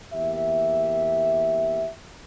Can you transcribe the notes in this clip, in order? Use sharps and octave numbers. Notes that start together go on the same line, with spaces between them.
E2 A#3 G4 E5